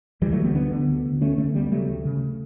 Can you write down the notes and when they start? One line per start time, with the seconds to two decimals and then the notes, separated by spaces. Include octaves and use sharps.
0.21 D2 E3 G3
0.32 F#3 A3
0.38 D3
0.44 G3 B3
0.55 D2 B3 D4
0.71 D3
0.88 D2
1.05 D3
1.21 D2 A3 C#4
1.38 D3 A3 C#4
1.54 D2 G3 B3
1.71 C#3 F#3 A3
1.88 D2
2.05 C#3